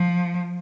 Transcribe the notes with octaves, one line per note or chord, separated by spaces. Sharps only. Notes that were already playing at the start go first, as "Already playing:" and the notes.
Already playing: F3